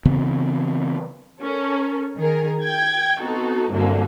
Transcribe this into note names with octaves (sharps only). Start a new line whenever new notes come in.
C#3 E3 B3 C4
C#4 A4 A#4
D#3 G#4 A#4
G5 G#6
B3 C4 D#4 F#4 A4
C2 G2 D3 F#3 A#3